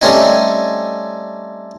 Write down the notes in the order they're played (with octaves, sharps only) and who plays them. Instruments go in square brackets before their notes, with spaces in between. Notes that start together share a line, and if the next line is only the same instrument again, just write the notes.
[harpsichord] G3 A3 C4 C#4 D#4